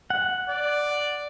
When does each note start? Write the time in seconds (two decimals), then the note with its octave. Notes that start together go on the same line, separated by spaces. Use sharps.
0.10 F#5
0.50 D5